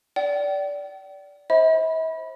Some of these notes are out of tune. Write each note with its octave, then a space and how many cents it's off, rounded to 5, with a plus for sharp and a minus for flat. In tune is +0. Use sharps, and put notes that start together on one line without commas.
D5 -20 G5 -40
C5 +25 E5 -45 B5 -10